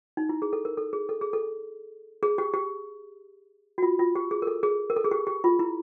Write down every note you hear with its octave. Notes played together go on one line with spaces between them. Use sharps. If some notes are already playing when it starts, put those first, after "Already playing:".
D#4
E4
G#4
A4
A#4
A4
G#4
A4
G#4
A4
G#4
G4
G4
F#4
F4
F4
G4
G#4
A#4
A4
G#4
A#4
A4
G#4
G4
G4
F4
E4